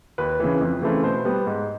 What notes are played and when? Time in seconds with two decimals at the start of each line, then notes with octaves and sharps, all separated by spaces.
0.18 D#2 B4
0.40 C#3 E3
0.61 F2
0.82 C#3 E3 A3 C4
1.03 B2 C5
1.25 G3 B3
1.46 G#2